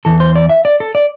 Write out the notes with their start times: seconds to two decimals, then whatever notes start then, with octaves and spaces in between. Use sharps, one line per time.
0.05 E2 E3 A4
0.20 C5
0.36 D5
0.49 E5
0.65 D5
0.80 A4
0.95 D5